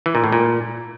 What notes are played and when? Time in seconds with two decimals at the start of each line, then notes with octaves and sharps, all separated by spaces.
0.06 E3
0.15 A#2
0.24 A2
0.32 A#2